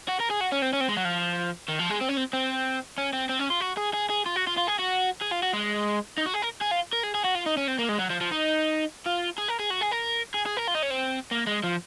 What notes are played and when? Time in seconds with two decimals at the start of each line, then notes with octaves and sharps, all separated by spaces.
0.08 F#4
0.20 A#4
0.30 G#4
0.40 F#4
0.52 C#4
0.62 C4
0.73 C#4
0.81 C4
0.88 G#3
0.97 F#3
1.05 F3
1.69 D#3
1.79 F3
1.90 G#3
2.01 C4
2.09 C#4
2.17 C4
2.33 C4
2.98 C#4
3.13 C4
3.29 C4
3.40 C#4
3.50 F4
3.61 F#4
3.77 G#4
3.94 G#4
4.10 G#4
4.26 F4
4.36 F#4
4.47 F4
4.58 F4
4.68 G#4
4.79 F#4
5.22 G#4
5.32 F4
5.43 F#4
5.53 G#3
6.18 D#4
6.26 F#4
6.34 G#4
6.42 A#4
6.61 G#4
6.71 F4
6.93 A#4
7.03 G#4
7.15 G#4
7.24 F#4
7.35 F4
7.46 D#4
7.57 C#4
7.68 C4
7.79 A#3
7.89 G#3
7.99 F#3
8.10 F3
8.21 F3
8.31 D#4
9.06 F4
9.38 G#4
9.49 A#4
9.60 G#4
9.70 F#4
9.81 G#4
9.92 A#4
10.34 G#4
10.46 G#4
10.57 A#4
10.67 F4
10.75 D#4
10.82 C#4
10.90 C4
11.31 A#3
11.47 G#3
11.64 F3